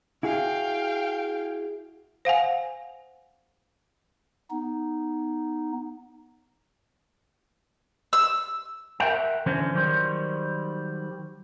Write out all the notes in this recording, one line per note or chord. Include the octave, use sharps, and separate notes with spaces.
E4 F#4 G#4 F5 G5
C5 F5 F#5 G#5
B3 D#4
E6
A#4 E5 F#5 G5
D3 E3 F#3 C#4 C5
D#3 F#3 G3 C5